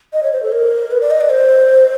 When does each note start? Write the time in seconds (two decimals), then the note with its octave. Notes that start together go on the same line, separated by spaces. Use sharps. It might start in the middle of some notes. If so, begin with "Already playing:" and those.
0.13 D#5
0.23 C#5
0.33 C5
0.43 A4
0.52 A#4
0.91 B4
1.01 D5
1.11 D#5
1.21 D5
1.30 C5